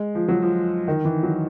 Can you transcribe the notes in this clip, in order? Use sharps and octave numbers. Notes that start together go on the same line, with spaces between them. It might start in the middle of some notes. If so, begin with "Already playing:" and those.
Already playing: G#3
F3
F#3
F3
D#3
E3
F#3